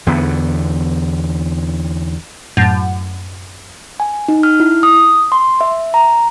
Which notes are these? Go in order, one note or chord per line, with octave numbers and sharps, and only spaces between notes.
E2 D3 B3
F#2 A2
G#5
D#4
F6
E4
D#6
C6
E5
A#5